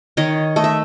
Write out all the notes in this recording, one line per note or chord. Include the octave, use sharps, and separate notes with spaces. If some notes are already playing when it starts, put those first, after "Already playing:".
D#3 C#5 D#5
A3 D#5
E5